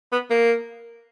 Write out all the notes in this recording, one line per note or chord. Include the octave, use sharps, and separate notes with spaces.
B3
A#3